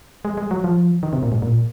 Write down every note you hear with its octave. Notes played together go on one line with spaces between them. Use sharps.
G#3
G#3
F#3
F3
D#3
C3
A#2
G#2
A#2